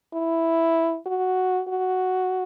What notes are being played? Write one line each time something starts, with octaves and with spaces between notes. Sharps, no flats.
E4
F#4
F#4